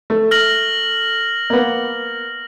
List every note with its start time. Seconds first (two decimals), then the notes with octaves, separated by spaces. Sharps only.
0.10 A3
0.31 F6 A#6 F#7
1.50 A#3 B3